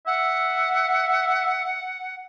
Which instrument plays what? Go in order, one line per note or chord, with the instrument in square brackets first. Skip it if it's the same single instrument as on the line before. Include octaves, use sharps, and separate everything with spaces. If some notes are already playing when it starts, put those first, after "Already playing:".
[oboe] E5 [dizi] F#5